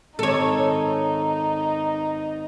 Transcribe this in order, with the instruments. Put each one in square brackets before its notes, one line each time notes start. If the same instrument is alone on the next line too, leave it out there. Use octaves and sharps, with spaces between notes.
[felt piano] G#1 D6 [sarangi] D#4 [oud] A4 C#5